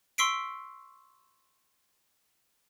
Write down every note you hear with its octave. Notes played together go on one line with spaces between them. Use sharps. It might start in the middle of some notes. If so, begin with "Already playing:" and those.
C6 C#6 E6 B6 C7 D7